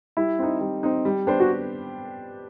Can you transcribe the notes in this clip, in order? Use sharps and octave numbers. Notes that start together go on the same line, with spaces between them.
G3 E4
C4 D#4
G3
C4 D#4
G3
B3 D4 G4 C5
F#4